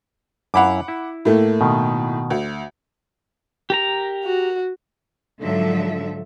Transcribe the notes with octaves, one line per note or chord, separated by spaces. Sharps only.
F#2 E4 F5 F#5 B5 D6
E4
A2 A3 A#3
B2 D#3
D2
G4 A#4 A#5
F#4
G#2 D3 F3 F#3 A4 E5